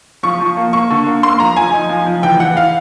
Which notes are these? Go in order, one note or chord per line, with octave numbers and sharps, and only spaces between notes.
F3 C#6
F3
A#3
A#3 C#6
D3
A#3
A#3 C6
F3 A#5
F3 G#5
D#4
F3
F3
E3 G5
E3 F#5
F5